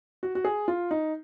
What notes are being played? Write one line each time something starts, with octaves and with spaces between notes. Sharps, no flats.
F#4
F#4
G#4
F4
D#4